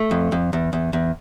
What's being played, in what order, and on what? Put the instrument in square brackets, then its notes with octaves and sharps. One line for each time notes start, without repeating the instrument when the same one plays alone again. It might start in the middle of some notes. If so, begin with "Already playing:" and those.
Already playing: [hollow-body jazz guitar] A3
F2
F2
E2
E2
E2